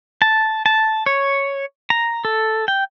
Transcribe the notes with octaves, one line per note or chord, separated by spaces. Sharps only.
A5
A5
C#5
A#5
A4
G5